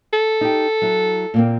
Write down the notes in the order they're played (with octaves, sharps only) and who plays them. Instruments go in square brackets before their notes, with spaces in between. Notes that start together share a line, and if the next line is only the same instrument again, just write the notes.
[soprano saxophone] A4
[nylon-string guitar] D#4 G4
F#3 E4
A#2 A#3 C4